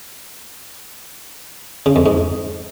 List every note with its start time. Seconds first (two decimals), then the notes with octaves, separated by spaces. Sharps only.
1.86 C#3
1.96 F2
2.06 G#2